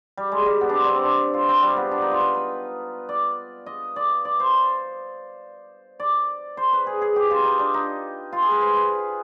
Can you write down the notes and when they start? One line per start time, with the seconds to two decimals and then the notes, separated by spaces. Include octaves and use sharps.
0.17 G3
0.32 G#3
0.46 G3
0.61 B3
0.69 D4
0.75 C4
0.85 D4
0.95 C4
1.04 D4
1.34 F4
1.49 C4
1.63 G3
1.77 B3
1.91 D4
2.01 D#4
2.11 F4
2.20 B4
2.35 B4
3.09 D5
3.66 D#5
3.96 D5
4.25 D5
4.40 C5
6.00 D5
6.57 C5
6.73 B4
6.87 G#4
7.01 G#4
7.16 G4
7.31 F4
7.45 D#4
7.59 D4
7.74 D#4
8.33 F4
8.42 G#4
8.52 B4
8.61 C5
8.76 B4